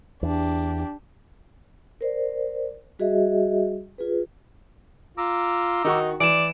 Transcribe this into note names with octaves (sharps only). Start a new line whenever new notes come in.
E2 D4 G4
A#4 C5 D5
G3 F#4 G#4 D#5 E5
F4 G#4 B4
F4 A#5 D6 E6
D#3 D#4 F#4 C#6
E3 D5 D7 E7